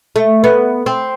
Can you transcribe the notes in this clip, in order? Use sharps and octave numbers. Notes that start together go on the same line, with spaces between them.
A3
B3
C4